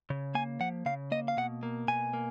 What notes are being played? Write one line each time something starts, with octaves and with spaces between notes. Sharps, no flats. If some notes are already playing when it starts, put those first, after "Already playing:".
C#3
A#3 G#5
F3 F#5
C#3 F5
A#3 D#5
F5
B2 F#5
A#3
B2 G#5
A#3